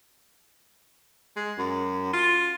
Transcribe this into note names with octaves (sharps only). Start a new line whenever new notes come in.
G#3
F#2
F4